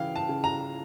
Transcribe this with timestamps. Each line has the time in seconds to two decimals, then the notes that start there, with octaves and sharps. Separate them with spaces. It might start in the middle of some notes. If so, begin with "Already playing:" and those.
Already playing: C#3 E3 F5 G5
0.16 A5
0.29 C#3
0.44 A#5